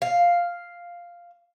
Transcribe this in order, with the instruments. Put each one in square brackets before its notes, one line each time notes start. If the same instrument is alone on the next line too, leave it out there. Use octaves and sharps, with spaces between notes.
[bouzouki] F5